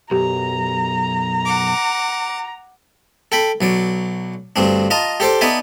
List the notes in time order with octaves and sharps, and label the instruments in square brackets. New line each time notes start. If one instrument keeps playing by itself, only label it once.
[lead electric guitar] B1 F#2 [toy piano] G4 [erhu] A#5
[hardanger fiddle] F#5 D6
[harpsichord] A4 G5 B5
B1 F#3 D5
D2 G2 C4 D4
F4 D#5 A5 A#5
G4 A4 C5 D5
B3 D#4 D5 E5 G#5 A5